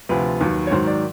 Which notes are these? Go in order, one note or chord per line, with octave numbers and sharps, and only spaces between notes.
D2 C3 F3 B4
D#2 D#3 F#3
C#5
G#2 D#3 F#3 C5
D5